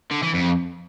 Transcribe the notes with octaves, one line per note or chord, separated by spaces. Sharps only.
D3
E3
F2